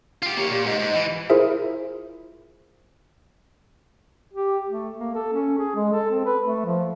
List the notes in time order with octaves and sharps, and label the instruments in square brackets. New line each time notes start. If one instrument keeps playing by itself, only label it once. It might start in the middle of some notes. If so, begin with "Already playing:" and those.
[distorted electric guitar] F4 G4
[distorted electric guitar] A#3 C#5 [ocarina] G4
[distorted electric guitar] A#2 [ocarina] G4
[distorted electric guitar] G#2 [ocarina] D#5
[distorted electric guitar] G#2
E3
[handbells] E4 F4 G#4 A#4 C5 E5
[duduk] G4
A3
A#3
A4
C#4
G#4
G#3
A4
C4
B4
A3
F3